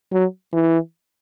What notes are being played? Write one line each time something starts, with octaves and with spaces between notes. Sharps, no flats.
F#3
E3